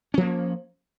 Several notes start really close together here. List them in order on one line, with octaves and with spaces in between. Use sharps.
C#4 F3 A#3